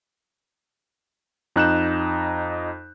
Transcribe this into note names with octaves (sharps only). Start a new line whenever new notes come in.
F2 D#4 F#6 G6 E7